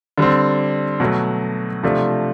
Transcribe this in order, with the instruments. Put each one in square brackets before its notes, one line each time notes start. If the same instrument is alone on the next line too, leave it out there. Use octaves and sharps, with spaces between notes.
[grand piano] D3 G3 C4
B2 F#3 A3
C3 F3 A3 D4